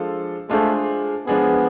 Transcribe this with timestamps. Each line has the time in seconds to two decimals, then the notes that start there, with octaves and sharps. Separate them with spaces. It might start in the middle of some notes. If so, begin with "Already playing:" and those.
Already playing: F3 G#3 D4 F4 A4
0.50 G#3 A3 D4 F4 G#4 C5
1.27 F3 G#3 B3 D4 G#4